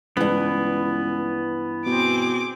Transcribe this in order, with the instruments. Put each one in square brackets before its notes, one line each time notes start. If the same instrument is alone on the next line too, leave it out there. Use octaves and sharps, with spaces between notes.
[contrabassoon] C#2 [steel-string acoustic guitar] G2 E3 [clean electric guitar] B3
[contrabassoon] B2 [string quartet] C4 G#4 D6